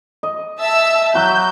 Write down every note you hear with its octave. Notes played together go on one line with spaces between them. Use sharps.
D#5
E5 A5 E6
F#3 F#4 B5 G6